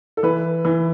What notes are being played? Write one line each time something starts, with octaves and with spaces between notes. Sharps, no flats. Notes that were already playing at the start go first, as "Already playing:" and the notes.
A4
E3 B4
E3